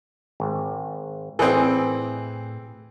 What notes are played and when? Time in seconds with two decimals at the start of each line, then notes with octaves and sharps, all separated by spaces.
0.40 G#1
1.39 A2 E3 C4 G#4